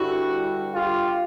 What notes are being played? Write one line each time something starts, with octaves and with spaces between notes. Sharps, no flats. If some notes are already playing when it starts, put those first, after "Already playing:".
Already playing: G2 D3 G3 E4 F#4
F4 G4